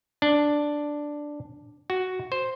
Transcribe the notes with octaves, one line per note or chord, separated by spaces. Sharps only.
D4
F#4
C5